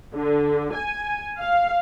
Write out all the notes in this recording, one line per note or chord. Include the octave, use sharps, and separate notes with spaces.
D3
G#5
F5